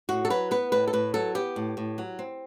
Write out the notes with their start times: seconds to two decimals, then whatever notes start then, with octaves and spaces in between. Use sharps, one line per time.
0.09 A2 F#4
0.25 A4
0.30 F#3 B4
0.51 B3 B4
0.72 A2 B4
0.88 A4
0.93 A2 B4
1.14 F#3 A4
1.35 B3 G4
1.56 A2
1.77 A2
1.98 F#3
2.19 C4